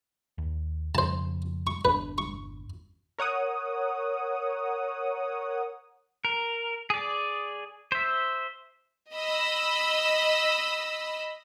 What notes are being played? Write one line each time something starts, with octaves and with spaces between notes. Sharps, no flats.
D#2
F2 C#3 C5 A5
C#6
G1 E2 D4 B4
C#6
A#4 C#5 F#5 D#6
A#4
G#4 D5
C5 E5
D#5 B5 E6